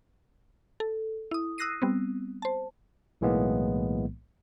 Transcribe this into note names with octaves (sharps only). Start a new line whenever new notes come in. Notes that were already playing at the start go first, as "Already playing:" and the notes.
A4
E4 D#6
D#6 E6 F#6 A#6 C7 D#7
G3 B3 C4
C5 A5
B1 A2 E3 G#3 A#3 B3